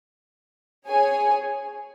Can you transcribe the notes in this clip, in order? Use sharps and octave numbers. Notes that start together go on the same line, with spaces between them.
G#4 C#5 G#5